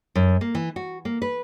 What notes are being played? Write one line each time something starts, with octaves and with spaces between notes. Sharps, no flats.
F#2
A#3
E3
F#4
A#3
B4